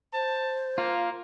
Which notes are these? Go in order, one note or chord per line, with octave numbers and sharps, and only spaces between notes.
C5 A5
A#3 F4